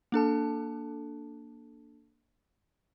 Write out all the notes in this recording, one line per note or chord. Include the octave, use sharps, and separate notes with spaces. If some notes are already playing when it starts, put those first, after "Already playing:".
A#3 D4 A4 A5